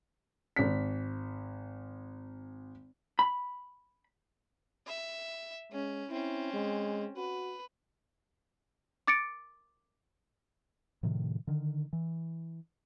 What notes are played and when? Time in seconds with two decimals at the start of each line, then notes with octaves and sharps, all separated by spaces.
0.56 G#1 B6
3.19 B5
4.87 E5
5.72 G#3 C#4
6.10 C4 C#4 E4
6.53 G#3
7.16 F#4 B4
9.07 D6 A6 C#7 D7
11.03 A2 C3 D#3 F3
11.47 D3 D#3
11.93 E3